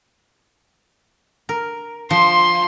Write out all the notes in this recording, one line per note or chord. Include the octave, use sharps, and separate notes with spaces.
A#4
F3 C6